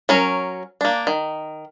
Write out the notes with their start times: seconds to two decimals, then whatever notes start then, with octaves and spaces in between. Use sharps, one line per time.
0.09 F#3 C#4 A#4
0.81 A#3 D4
1.07 D#3